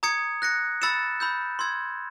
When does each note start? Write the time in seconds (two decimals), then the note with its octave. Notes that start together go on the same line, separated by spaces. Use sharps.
0.03 A#5 D#6 G#6 C#7
0.42 F#6 A#6 C#7
0.82 B5 E6 A6 C#7 E7
1.20 B5 E6 G6
1.59 C6 E6 G#6